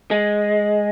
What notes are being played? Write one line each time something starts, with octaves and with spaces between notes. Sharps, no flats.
G#3